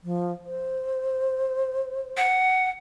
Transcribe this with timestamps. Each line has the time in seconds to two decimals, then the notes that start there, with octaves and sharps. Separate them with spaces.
0.03 F3
0.46 C5
2.17 F#5